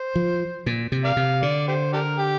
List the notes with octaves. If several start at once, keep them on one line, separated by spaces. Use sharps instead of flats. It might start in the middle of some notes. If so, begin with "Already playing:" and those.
Already playing: C5
F3
A#2
C3
A#4 D5 F5
C3
D3 D5
G4 C5
D4 G4 A#4
G4